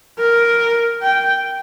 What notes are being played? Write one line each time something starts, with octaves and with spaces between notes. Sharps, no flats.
A#4
G5